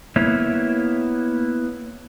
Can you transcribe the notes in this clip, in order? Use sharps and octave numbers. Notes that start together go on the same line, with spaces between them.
A#3 B3 E4 C#5